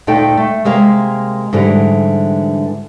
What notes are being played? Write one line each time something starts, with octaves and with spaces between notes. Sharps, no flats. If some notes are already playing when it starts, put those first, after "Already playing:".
D2 A#2 A3 D#4 A4 G5
A3
C3 G#3 A#3 F5
G#2 D3 E3 G3